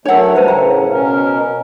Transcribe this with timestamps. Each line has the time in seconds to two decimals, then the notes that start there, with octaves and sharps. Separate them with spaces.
0.05 F#3 A3 D4 A#4 C#5 F#5
0.35 F3 G3 A3 B4 C5 A5
0.48 A2 C#3 G5 A#5
0.90 B2 C#4 A#4